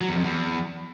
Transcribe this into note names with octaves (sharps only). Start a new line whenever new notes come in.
F#3
E2
F2
E2